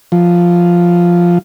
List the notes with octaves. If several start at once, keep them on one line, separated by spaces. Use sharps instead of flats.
F3